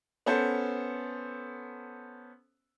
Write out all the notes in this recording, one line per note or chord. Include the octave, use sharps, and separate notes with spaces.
B3 C#4 A4 C5